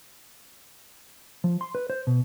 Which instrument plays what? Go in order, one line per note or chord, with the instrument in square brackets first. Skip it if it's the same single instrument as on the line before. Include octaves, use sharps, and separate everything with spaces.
[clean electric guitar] F3
C6
B4
C5
B2